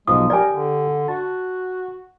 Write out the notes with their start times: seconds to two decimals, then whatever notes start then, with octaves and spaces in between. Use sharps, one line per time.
0.08 B1 F3 G#3 F4 D#6
0.30 G4 A#4 D5 G#5 A#5
0.50 D3
1.08 F#4 A5